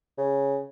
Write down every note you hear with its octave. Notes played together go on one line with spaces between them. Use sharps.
C#3